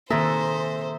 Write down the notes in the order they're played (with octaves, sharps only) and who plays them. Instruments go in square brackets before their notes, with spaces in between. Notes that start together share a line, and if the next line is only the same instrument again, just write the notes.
[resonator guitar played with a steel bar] C3 A4 [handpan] D#3 A#3 [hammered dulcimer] G#4 E5 A#5 [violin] C5